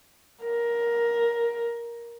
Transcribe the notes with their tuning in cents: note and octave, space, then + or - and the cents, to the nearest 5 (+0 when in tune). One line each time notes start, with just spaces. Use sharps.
A#4 +10